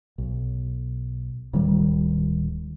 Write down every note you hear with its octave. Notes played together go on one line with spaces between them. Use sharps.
B1
D1 D#3 G3